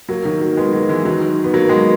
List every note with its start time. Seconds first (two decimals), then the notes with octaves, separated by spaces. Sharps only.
0.09 F#3 A#3
0.25 D#3 F#3
0.41 F#3 A#3
0.57 G#3 B3
0.73 F#3 A#3
0.89 E3 G#3
1.05 D#3 F#3
1.44 B3
1.54 F#3 A#3
1.69 G#3 B3